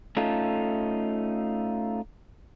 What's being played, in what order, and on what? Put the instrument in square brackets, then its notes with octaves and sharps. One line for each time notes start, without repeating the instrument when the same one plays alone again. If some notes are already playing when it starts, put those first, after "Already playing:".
[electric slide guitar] A3 C#4 D#4 F4 A4